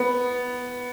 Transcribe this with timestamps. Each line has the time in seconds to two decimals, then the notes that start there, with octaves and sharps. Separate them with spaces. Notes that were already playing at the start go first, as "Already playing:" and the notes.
Already playing: B3